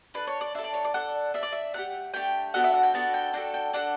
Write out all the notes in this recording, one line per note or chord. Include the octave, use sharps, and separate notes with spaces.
D4 A4 B4
C#5
D5
D4 A4 E5
D5
C#5
D5
D4 A4 F#5
D4 A4 E5
D5
E5
A3 D4 G4 F#5
A3 D4 G4 G5
B3 D4 F#4 A4 F#5
E5
F#5
G5
B3 D4 F#4 A4 A5
G5
D4 F#4 A4 G5
G5
D4 F#4 A4 F#5